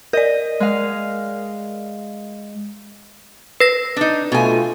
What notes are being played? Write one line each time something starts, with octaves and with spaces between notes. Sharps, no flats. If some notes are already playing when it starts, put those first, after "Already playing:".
A#4 D5 D#5
G#3 F5
B4 A#6
D4 D#4
B2 A3 F4 G#5